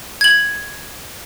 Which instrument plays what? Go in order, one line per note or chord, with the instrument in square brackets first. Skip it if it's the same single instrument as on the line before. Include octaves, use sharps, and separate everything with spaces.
[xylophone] G#6 F#7